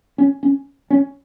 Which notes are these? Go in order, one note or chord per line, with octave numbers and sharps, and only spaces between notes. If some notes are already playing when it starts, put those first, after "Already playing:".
C#4
C#4
C#4